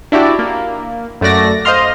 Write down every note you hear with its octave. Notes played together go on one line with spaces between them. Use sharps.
D4 E4 F#4 G4 D5
A#3
F#2 A3 F#4 D5 A#6
C5 D#5 F5 A#5 C6 F6